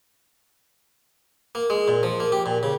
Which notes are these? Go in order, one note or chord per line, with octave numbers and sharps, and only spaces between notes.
A#3
G#3
A#2
F3
A#3
G4
A#2
C#3